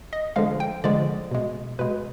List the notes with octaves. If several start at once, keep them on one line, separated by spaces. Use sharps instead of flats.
D#5
D3 F3 G#3 F5
G5
D3 F3 G#3 D5
B2 G#3
B2 G#3 B4